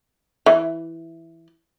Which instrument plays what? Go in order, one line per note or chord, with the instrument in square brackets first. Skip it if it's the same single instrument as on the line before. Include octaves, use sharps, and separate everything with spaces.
[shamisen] E3